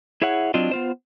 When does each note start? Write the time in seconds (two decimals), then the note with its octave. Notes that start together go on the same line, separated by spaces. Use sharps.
0.22 E4 G#4 C#5 E5 F#5
0.54 F#3 C4 D4 F4 D#5
0.71 B3 F4 C5